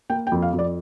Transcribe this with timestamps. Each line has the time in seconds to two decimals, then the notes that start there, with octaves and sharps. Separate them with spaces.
0.10 A#3 G5
0.27 G5
0.32 F2
0.42 F5
0.53 F2
0.59 D5